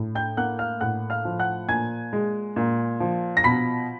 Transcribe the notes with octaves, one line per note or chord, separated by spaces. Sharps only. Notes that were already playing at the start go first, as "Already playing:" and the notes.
Already playing: A2
G5 G6
A#3 F#5 F#6
F5 F6
A2 F#5 F#6
F5 F6
F3
F#5 F#6
A#2 G#5 G#6
G#3
A#2
F3
A#6
B2 B5 B6